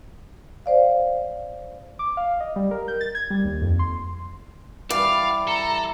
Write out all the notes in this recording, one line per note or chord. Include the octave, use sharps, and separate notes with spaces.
C5 D5 F5
D6
F5
D#5
G3
A#4
G6
A6
G#6
G3
D#2
F2
C6
E3 G3 D5 F5
A4 A#5